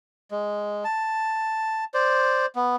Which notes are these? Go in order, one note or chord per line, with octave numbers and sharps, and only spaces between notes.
G#3
A5
C5 D5
B3